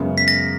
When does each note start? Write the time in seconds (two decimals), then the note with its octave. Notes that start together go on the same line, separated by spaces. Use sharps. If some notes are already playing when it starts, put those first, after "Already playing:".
Already playing: F#2 C#3 G#3 B3
0.18 B6
0.28 A#6